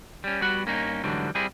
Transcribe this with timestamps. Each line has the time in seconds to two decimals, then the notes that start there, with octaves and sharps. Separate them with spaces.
0.24 G3 C#4
0.42 G3 B3 F#4 F#5
0.66 G2 A#3 C#4 D#4
1.04 G#2 D3 E3 F#3 G3
1.35 G3 C4 E4 G#4